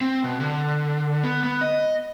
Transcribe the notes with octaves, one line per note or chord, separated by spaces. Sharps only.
C4
B2
D3
B3
B3
D#5